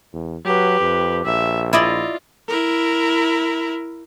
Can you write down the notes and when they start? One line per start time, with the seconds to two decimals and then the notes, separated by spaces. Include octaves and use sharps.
0.13 E2
0.45 F#3 G4 B4
0.80 F2
1.25 A#1 E5
1.73 E4 F4 D5 D#5
2.49 E4 A#4